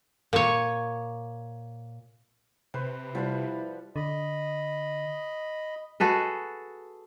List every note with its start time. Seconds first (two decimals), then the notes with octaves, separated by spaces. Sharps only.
0.33 A#2 C#5
2.74 C3 B4 C5
3.15 F3 G3 E4 B4 F#5
3.96 D3 D#5 B5
6.00 F#4 G#4 A4 B4